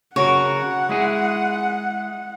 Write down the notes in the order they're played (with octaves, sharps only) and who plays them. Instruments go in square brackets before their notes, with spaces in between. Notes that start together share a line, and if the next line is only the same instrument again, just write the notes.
[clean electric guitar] C#3 F#4 A#4 [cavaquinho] C#5 [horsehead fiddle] F#5
[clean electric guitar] G#3 E4 G#4